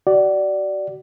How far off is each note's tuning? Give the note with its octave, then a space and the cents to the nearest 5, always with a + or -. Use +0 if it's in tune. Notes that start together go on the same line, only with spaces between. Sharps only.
F#4 +35 D5 +0